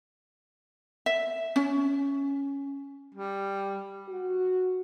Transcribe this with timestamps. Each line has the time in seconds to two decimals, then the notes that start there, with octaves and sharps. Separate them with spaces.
1.06 E5
1.56 C#4
3.15 G3
4.08 F#4